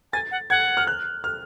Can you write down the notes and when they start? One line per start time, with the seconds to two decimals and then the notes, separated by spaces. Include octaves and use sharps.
0.13 G#5 A6
0.31 F#5
0.50 F#5 G#6
0.77 F6
0.87 F#6
1.24 F6